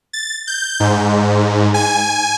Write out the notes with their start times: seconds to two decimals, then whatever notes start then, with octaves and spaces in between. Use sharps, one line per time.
0.13 A6
0.47 G6
0.80 G#2
1.74 G#5